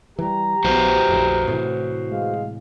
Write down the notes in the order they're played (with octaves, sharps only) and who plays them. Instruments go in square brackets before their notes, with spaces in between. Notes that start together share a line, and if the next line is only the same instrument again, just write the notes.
[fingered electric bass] E3 G3 [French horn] G4 [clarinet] A#5
[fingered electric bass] A#1 E3 B3 [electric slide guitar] F#4 B4 C5
[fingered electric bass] A#1 F2
A2 C3 E3
[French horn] G#3 [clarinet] F5